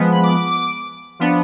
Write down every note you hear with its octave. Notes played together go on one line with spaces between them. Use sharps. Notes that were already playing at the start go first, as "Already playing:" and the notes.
Already playing: F3 G#3 B3
B5
D6
F3 B3 D4